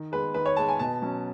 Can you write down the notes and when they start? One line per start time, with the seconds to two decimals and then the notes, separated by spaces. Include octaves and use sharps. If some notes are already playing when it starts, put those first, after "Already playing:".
Already playing: D#3
0.12 G#3 B3 B4
0.34 D#3 B4
0.46 C#5
0.57 G#3 B3 A5
0.69 G#5
0.79 B2 A5
1.02 F#3 C#4